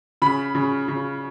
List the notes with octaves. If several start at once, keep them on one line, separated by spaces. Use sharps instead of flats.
C#3 B5
C#3
C#3